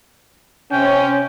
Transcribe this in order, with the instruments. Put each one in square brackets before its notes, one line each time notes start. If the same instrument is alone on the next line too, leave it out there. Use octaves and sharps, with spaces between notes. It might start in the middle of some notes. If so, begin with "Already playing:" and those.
[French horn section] C3 C#4 [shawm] G5